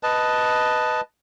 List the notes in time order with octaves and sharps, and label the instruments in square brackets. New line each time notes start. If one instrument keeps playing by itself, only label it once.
[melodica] B4 D#5 A5